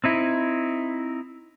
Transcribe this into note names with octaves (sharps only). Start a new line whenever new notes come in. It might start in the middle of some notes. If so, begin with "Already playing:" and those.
C4 D#4 E4